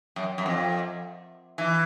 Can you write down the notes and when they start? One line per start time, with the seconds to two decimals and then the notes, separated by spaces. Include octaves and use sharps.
0.16 F#2
0.38 F#2
0.46 F2
1.58 E3